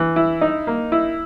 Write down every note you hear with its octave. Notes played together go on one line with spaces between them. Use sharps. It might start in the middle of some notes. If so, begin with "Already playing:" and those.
Already playing: E3
E4
D#4
A#3
E4